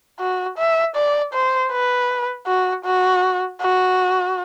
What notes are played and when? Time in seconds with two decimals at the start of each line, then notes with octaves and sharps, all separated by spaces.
0.20 F#4
0.58 E5
0.95 D5
1.33 C5
1.72 B4
2.47 F#4
2.85 F#4
3.61 F#4